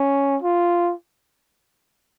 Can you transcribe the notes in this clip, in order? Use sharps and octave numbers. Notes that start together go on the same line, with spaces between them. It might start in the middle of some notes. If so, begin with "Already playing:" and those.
Already playing: C#4
F4